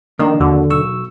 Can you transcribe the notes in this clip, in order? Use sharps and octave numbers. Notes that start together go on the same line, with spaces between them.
F2 D#3 A#3 D4
D#2 D3 F#4
B1 C#6 E6